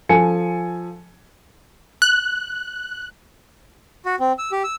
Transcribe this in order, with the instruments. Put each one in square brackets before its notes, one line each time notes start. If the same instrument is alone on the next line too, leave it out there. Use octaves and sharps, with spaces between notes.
[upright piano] F3 A4 G#5 C#7
[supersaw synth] F#6
[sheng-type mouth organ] F#4
C4
E6
G4
E6